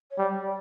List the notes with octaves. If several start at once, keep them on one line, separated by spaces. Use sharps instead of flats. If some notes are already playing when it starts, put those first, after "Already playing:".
C#5
G3 D5